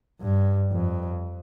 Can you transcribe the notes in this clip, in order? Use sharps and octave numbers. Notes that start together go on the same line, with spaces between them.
G2
F2